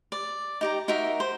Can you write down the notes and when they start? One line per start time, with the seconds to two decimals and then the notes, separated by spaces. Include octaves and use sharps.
0.12 D5
0.61 D#4 G4 A#5
0.88 D#4 F#4 A#4 E5
1.20 C5